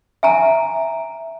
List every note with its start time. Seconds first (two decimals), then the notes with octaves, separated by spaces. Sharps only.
0.23 E5 G#5 A#5